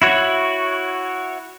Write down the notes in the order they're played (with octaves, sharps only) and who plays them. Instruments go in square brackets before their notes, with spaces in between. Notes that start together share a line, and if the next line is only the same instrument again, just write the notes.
[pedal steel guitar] E4 F#4 C#5